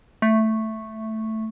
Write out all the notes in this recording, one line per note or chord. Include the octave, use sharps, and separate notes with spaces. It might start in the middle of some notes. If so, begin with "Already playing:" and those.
A3